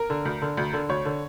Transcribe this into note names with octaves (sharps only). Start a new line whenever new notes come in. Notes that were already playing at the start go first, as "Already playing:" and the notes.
Already playing: A#4
D3
D2
D3
D2
D3
D2 C#5
D3